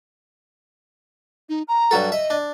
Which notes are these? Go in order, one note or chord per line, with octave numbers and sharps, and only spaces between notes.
D#4
A#5
G2 F#3 A4
D#5 E5
D4